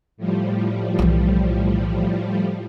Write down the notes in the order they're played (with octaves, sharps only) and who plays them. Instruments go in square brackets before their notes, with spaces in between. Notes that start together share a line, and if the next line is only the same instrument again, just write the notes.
[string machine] A2 F3 G3
[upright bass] B1 E3